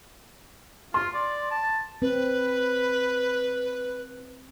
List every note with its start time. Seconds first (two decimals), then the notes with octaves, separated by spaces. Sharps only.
0.94 F4 C6
1.15 D5
1.51 A5
2.02 C4 B4